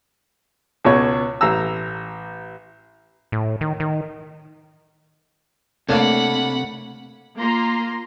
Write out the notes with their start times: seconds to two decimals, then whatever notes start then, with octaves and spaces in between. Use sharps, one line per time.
0.85 C#2 B2 C#5
1.41 A1 A#5 E6
3.32 A2
3.61 D#3
3.80 D#3
5.89 C3 A3 A#3 D4 C#5 F#5 B5
7.38 A#3 F4 A#5 C6